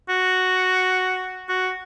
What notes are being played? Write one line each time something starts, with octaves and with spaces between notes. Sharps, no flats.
F#4
F#4